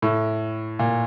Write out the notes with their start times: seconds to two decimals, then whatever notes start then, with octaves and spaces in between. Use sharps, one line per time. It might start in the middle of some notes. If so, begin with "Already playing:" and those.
0.02 A2
0.79 A#2